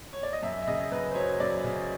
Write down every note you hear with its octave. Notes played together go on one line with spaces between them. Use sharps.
C#5
D5
D#5
F#2 E5
E5
C#3 D#5
F#2 B4
C5
F#3 C#5
F#2 D5
C#3